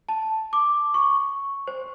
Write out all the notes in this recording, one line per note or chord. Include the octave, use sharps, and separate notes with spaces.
A5
D6
C#6
C5